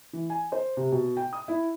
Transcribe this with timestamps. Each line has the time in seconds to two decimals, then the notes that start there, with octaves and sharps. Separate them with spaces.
0.13 E3
0.30 G#5
0.52 C5
0.77 C3
0.92 B2
1.17 G5
1.33 D#6
1.48 E4